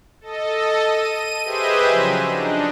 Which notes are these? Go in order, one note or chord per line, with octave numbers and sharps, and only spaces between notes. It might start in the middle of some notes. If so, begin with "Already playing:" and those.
A4 D#5
D#7
G4 G#4 B4 C5 D#5 E5
C#3 F3 F#3
D4 D#4